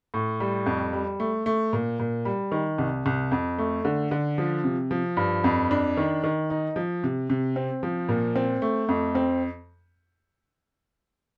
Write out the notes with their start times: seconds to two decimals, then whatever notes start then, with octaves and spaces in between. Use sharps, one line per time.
0.14 A2
0.40 G3
0.66 F2
0.93 G3
1.20 A3
1.46 A3
1.73 A#2
1.99 A#2
2.25 G3
2.52 D#3
2.78 C2
3.06 C2
3.32 F2
3.58 A3
3.85 D3
4.11 D3
4.38 F3
4.64 C3
4.91 F3
5.17 G2
5.44 F2
5.71 D4
5.97 D#3
6.24 D#3
6.50 D#4
6.76 F3
7.03 C3
7.30 C3
7.56 C4
7.83 F3
8.09 A#2
8.36 C4
8.62 A3
8.89 F2
9.15 C4